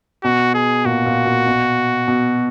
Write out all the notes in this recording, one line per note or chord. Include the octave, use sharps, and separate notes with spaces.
B2 F#4
G#4
A#2 F#4
A#2
A#2
B2
B2